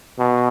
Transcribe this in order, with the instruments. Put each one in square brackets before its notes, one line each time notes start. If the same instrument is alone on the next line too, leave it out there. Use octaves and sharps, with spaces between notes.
[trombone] B2